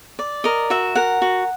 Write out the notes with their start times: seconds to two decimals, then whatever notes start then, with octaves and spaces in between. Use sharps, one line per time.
0.19 D5
0.44 A#4 D#5
0.70 F#4 E5
0.95 A#4 F#5
1.22 F#4